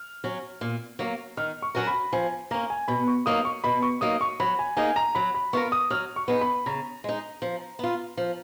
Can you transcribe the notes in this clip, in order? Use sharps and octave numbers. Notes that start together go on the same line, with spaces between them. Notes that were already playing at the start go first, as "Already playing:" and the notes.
Already playing: F6
F#3 C#4
A#2
F#3 A#3
D#3 F6
C#6
F#3 C#4 F#4 A#4
B5
F3 G#5
A#3 C#4 A#5
G#5
B2 B5
C#6
F#3 A#3 D#4 D#6
C#6
B2 B5
C#6
F#3 A#3 D#4 D#6
C#6
F#3 B5
G#5
A#3 D#4 G#4 G#5
A#5
F#3 B5
B5
B3 F4 A#4 C#6
D#6
F#3 F6
C#6
B3 D#4 G#4
B5
C#3 A#5
G#3 D#4
F3
B3 F4
F3